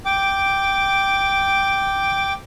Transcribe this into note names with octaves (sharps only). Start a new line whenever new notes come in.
G5 D6